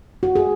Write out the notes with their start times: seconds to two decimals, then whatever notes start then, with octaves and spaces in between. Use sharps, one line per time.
0.23 F#4
0.36 G#4